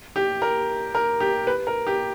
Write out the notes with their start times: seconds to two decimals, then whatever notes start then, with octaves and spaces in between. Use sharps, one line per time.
0.16 G4
0.42 A#4
0.95 A#4
1.20 G4
1.47 B4
1.67 A#4
1.87 G4